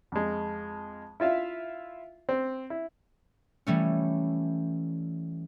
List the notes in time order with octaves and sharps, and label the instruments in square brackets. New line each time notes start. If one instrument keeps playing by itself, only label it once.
[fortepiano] F2 G#3
E4 F4 E5 F5
C4
E4
[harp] E3 G3 A3 C#4